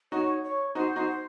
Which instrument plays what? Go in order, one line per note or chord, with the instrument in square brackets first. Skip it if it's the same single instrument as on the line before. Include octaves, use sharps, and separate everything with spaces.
[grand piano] D#4 F#4 [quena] C#5
[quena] C#5
[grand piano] D#4 F#4 [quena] C5
[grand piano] D#4 F#4